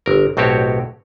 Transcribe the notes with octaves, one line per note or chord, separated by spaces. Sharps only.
G1 A#4
B1 A2 C4 F#4 G4 C#5